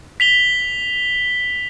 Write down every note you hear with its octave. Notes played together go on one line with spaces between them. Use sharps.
B6 F7 G7